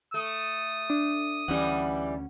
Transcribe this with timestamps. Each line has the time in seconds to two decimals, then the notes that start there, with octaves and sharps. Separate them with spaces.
0.14 A3 D#6
0.90 D4
1.48 D2 E3 G3 C#4 F#5